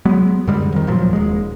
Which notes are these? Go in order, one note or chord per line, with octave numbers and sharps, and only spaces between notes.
F#3 G#3 B3
F#2 D3 G3 G#3
F2 D#3
D1 A#2 F3 F#3
D#1 G#3